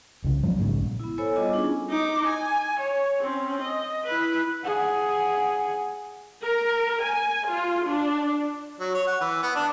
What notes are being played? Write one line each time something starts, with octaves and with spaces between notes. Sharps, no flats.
C2 C#3
F3 F#3 A3 A#3
A#1 G#2 C#3
B3 E4
B3 A4 C5 C#5 G#5 E6
G3 B3 F4 D#5 G#5 D6
C#4 D4 E4 F4 G#4
D#4 D6
G#5
C#5
C4 C#4
D#5
E4 B4
G#4 F#5
A#4
G#5
F4
D4
F#3
C#5
F#5
E3
B3
D4